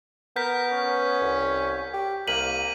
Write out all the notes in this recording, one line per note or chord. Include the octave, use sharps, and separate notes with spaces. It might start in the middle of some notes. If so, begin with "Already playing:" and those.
B3 A#4 G6 B6
C#4
C2
G4
C2 A#3 B6 D#7 F#7